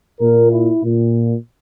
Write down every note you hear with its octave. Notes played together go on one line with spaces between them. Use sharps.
A#2 A#4
E4
A#2